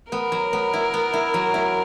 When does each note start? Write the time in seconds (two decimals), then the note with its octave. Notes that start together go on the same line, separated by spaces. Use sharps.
0.12 B3 A#4
0.32 F#3
0.53 B3
0.73 E4
0.94 B3
1.13 E4
1.34 F#3
1.54 E4